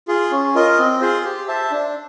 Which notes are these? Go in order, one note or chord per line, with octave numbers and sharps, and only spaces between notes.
F4 G#4
C#4
F4 A#4 D#5
C4
F4 G#4 C5
G4
C5 E5 A5
D4